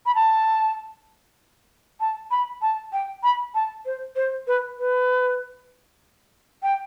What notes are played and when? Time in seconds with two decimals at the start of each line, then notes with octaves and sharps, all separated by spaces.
0.06 B5
0.15 A5
2.00 A5
2.31 B5
2.62 A5
2.93 G5
3.23 B5
3.55 A5
3.85 C5
4.16 C5
4.47 B4
4.79 B4
6.63 G5